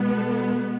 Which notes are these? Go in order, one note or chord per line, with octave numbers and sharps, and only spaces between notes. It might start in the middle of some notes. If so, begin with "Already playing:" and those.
Already playing: B2 G#3 B3
A4